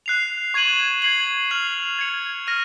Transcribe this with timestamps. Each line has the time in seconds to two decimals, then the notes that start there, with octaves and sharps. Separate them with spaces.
0.06 F#6 C7 F7
0.54 C#6 G#6 D#7 F#7
1.02 G#6 C7 F#7
1.51 F6 C7 F7
1.99 G#6 C#7 F7
2.47 F6 A#6 D#7